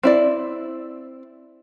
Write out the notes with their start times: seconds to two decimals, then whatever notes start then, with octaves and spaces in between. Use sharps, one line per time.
0.03 C4 E4 D5